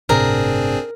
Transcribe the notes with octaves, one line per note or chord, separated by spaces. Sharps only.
G1 A2 C3 C4 D4 G#4 A#4